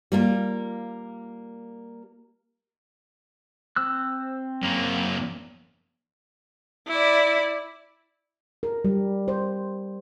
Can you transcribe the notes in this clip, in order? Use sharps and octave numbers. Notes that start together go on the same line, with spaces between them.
G3 A#3 F4
C4 E6 F#6
F#2 A#3
E4 D5
A#4
G3
C5